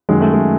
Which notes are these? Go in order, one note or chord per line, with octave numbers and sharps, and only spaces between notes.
F#2 D#3 G#3
A3
G#3